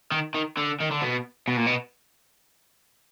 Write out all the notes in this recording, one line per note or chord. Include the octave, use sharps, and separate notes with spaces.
D#3
D#3
D3
D#3
D3
B2
B2
A#2
B2